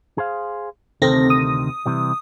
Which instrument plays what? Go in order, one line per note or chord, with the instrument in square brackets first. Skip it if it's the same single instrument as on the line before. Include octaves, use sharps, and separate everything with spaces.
[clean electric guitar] G#4 C5 F5
[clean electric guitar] D2 C3 D#3 [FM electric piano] C4 A4 A#6
[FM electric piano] D#6
[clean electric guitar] C3 E3 G3